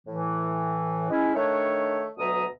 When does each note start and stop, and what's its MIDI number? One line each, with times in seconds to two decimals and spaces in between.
0.07 1.08 45
0.07 1.08 52
1.10 1.34 56
1.10 1.34 61
1.10 1.34 64
1.36 2.08 51
1.36 2.08 57
1.36 2.08 62
1.36 2.08 73
2.18 2.45 38
2.18 2.45 47
2.18 2.45 54
2.18 2.45 76
2.18 2.45 82
2.18 2.45 87